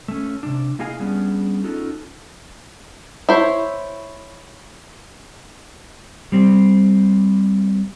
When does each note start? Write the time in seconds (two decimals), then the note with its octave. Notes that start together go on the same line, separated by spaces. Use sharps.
0.08 A3 C#4
0.43 C3 D4
0.79 A#3 E4 G#4 D#5 F5 G#5
1.00 G3 B3 C#4 D4 G#4
1.64 C#4 D#4 F4 F#4 A4
3.29 E4 C5 C#5
6.32 G3 C4